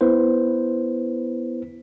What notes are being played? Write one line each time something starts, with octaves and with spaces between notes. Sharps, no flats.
B3 E4 B4 C5